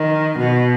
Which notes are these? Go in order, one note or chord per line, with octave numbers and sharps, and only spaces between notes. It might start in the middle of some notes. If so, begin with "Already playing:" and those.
Already playing: D#3
B2